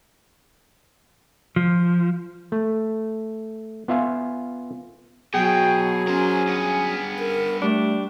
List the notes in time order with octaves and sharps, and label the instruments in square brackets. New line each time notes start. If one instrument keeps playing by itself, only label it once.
[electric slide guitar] F3
[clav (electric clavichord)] A3
B3 F4 E5 F5 G#5
[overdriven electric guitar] B2 [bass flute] F#3 [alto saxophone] G#4 [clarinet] G5
[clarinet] C#4 [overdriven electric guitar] A#4 C5
[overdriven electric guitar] G2 B3
[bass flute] A#4
[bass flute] G3 [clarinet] A3 [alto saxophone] D4